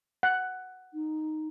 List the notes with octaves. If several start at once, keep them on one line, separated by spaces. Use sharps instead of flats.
F#5
D#4